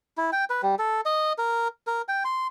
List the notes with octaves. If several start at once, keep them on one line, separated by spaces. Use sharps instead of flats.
E4
G5
B4
G3
A4
D#5
A#4
A#4
G5
C6